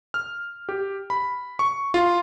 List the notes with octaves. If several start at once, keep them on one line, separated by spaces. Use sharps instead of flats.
F6
G4
B5
C#6
F4